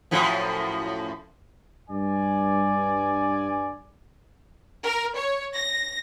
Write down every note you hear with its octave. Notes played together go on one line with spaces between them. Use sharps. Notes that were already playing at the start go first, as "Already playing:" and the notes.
F#2 A2 F3
G2 D5 G#5
A#4
C#5
A#6